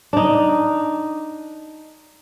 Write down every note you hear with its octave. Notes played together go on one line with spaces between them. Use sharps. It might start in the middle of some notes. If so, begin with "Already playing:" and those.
D4 D#4